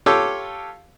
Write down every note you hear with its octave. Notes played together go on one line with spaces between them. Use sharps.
F4 G4 A4 C#5 D6 E6